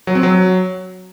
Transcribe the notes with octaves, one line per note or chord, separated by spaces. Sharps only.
F#3
C4
F#3